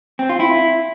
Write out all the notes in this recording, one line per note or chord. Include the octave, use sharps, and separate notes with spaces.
C4
F4
E4